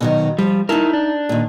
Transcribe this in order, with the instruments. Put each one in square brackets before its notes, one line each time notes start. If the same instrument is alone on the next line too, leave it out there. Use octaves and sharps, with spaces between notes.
[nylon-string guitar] B2 D#3 F#3
[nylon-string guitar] F3 [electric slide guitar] G3
[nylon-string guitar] D#4 A5 [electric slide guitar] E4 A#4
[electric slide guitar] D4
[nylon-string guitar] A#2 D#3